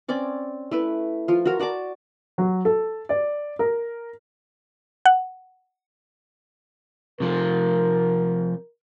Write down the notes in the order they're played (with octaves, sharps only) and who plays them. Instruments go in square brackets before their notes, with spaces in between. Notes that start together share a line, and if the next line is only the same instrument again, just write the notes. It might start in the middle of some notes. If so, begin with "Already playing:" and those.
[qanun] C4 C#4 D5 D6
A3 E4 B4
F3 F4
F#4 A#4
F#4 D5 A5 D6
[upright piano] F#3
A4
D5
A#4
[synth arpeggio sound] F#5
[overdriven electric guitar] C3 F3 [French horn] A#4